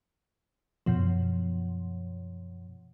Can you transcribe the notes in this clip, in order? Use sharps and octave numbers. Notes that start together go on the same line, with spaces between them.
F#2 B2 F3